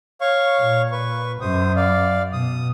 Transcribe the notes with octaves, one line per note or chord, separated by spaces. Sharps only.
C#5 F5 C#6
A#2
B4 C#6
F#2 C5 D#6
D5 F5
B2 D#6